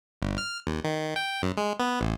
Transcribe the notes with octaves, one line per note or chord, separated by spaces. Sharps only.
G1
F6
D#2
D#3
G5
F#2
G#3
B3
A1